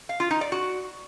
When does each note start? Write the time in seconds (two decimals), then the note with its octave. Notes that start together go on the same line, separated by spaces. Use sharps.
0.09 F5
0.20 F4
0.31 D#4
0.41 D5
0.52 F#4